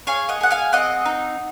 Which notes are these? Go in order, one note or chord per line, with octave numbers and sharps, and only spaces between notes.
G#4 C#5 F5
D#5 F#5
G#4 F#5
F5 G#5
C4 D#5 F#5
D#4